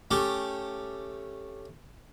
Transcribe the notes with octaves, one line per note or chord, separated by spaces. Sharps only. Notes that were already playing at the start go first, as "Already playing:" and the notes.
A3 C#4 G4